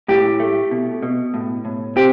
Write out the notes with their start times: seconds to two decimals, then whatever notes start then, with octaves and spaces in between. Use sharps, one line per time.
0.08 A2 G4
0.40 A3
0.71 B2
1.03 B2
1.34 A2
1.65 A2
1.96 C4 G4